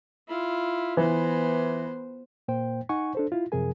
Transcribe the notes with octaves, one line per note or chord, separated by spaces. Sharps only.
E4 F4
E3 B3 C5
A#2 A#3 C5 G5
D#4 F#5 G#5 C#6
D4 A4 C5
E4 F4
F#2 C3 F3 G#4 A#4 G#5